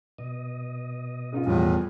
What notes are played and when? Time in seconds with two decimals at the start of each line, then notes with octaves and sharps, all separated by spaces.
0.18 B2 D#5
1.32 C#3 D#4 F4
1.46 E2 A2 F3 G3 F4